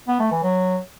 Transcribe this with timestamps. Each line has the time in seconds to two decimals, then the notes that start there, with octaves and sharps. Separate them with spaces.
0.08 B3
0.20 A3
0.31 E3
0.43 F#3